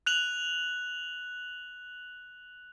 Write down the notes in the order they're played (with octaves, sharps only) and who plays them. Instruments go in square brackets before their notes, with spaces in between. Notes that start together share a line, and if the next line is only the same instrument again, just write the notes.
[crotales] F#6 F7 F#7